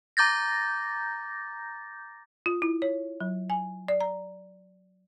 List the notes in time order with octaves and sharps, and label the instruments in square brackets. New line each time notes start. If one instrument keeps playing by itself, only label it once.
[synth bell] A#5 D6 G6 A6 A#6
[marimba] F4
E4
C#5
F#3
G#5
D5
A#5